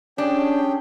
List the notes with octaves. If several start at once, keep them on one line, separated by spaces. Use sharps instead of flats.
C#4 D4 G4 G#4 G5